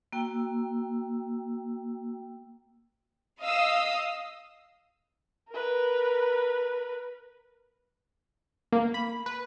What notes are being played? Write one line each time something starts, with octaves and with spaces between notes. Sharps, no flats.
A#3 F#4 G5 E6
D#5 F5 D#6 E6
A#4 B4
A#3
B5
B4